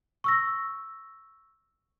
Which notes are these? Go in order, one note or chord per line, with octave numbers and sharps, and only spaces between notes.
C#6 E6 A#6